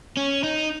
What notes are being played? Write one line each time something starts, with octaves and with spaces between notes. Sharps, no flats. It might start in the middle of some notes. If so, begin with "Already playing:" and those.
C#4
D#4